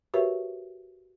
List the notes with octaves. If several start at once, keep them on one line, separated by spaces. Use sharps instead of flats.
F#4 G4 A#4 B4 C#5 E5